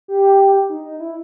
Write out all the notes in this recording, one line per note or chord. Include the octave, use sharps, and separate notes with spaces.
G4
D#4
D#4
E4